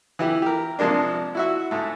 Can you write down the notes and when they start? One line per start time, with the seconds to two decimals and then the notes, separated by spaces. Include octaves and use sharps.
0.19 E3 E4 G4
0.42 G4 A#4
0.79 C3 F3 G#3 A#3 D4
1.35 E4 F#4 E5
1.71 G#2 A3